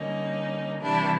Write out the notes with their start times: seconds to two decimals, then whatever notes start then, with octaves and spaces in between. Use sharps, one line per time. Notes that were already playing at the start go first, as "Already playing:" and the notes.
Already playing: D3 G3 A#3 C#4 D#4
0.81 C3 E3 G3 D4 E4